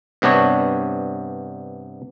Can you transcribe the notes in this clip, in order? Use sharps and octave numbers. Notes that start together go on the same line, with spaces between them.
G2 C3 B3 D4 C#5